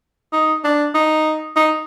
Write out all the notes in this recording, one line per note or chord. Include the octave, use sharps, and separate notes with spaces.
D#4
D4
D#4
D#4